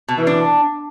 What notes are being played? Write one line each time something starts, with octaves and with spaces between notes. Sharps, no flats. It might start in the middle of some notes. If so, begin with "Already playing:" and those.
B2
E3
D4